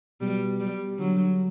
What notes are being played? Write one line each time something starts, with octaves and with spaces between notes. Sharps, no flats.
B2 G3
G3
D3 F#3